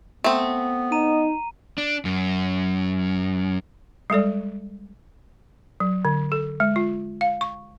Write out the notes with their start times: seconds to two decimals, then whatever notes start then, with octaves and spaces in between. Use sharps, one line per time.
0.24 A3 B3 C4
0.92 D#4 A#5 D#7
1.78 D4
2.05 F#2
4.10 G3 G#3 A4 D5
5.80 F#3
6.05 D3
6.32 A4
6.60 G#3
6.76 F4
7.21 F5
7.41 C#6